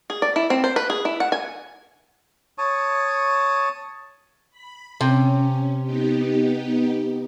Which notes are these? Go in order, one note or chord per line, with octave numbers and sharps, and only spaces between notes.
G#4
D5
E4
C4
C5
B4
G#4
E4
F#5
G#5
C#5 A5 C#6 D#6
B5
C3 C#4
B3 D#4 G4